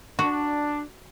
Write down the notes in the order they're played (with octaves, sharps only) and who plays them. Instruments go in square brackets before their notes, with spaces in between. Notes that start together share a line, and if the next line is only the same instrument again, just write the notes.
[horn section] D4 [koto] F#4